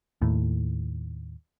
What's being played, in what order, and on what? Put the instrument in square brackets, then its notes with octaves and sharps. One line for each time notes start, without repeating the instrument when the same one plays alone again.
[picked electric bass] D#2 A2